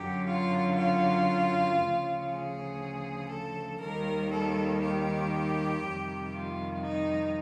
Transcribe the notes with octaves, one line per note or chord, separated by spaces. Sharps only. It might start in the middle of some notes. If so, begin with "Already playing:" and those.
Already playing: F#2 D3 F#3 G4
F4
F4
D2 C#3 F3
G#4
A4
D#2 D#3 G3 A#4
A4
G4
F2 C3 D#3 G3
F4
D#4